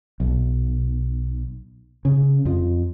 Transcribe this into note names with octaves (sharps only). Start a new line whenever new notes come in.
B1
C#3
F2 F3